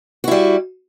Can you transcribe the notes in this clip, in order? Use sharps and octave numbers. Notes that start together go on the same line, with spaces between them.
G3 E4 F#4